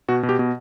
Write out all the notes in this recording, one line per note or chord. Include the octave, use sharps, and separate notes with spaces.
B2 F#4
B2
G4
B2